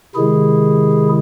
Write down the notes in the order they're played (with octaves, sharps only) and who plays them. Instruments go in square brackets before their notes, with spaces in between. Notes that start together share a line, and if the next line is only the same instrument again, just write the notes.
[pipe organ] C3 D#3 G#3 E4 G#4